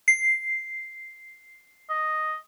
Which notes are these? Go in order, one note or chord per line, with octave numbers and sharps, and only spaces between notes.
C7
D#5